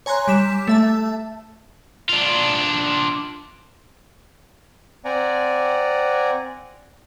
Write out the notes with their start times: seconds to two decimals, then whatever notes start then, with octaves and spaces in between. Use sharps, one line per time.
0.06 C#5 G#5 A#5 C6 F#6
0.27 G3 D6 B6 E7
0.67 A3 E5 A5
2.09 D4 F4
5.05 C4 D5 F#5 G#5 A#5